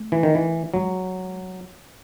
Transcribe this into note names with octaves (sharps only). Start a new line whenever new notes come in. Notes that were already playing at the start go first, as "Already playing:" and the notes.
Already playing: A3
E3
D#3
E3
F#3 G#3